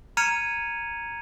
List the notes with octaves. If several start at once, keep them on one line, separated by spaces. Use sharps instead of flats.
A#5 F6 G#6 C#7 D#7 F7